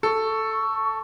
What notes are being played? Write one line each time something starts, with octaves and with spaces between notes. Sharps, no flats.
A4 C#6